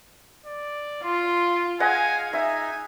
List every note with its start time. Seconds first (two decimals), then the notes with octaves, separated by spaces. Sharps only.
0.46 D5
1.04 F4 C6
1.80 G#4 D#5 F5 F#5 G#5
2.33 D#4 E5 G#5